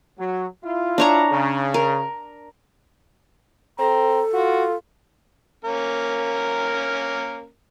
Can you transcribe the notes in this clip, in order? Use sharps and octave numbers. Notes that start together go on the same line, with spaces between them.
F#3
E4 F4
D4 C#5 A#5
C#3
A#4
C4 A4 A#5
F4 F#4
A#3 C#4 A#4